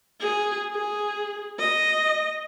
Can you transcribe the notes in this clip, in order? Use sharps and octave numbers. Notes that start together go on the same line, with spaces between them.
G#4
G#4
D#5